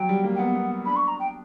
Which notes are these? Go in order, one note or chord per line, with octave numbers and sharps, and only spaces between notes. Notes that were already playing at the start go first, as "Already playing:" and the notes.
Already playing: F#3 G5
G3
A#3
G5
B3 F#5
B3
D4 B5
C#6
A#5
G5